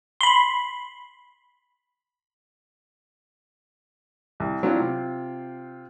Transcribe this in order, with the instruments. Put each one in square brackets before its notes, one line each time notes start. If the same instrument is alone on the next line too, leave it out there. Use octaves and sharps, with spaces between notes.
[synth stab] B5 C6
[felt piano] C2
[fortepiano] F#3 D4 E4 [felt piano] C4 F4
[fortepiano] C3